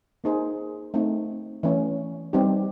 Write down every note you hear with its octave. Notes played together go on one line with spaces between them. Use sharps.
A#3 D#4 G#4 C5
A3 C4 D#4
E3 A3 C#4
G3 C4 D#4 G4